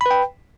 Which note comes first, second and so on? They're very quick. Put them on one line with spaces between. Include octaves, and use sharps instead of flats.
B5 B4 G5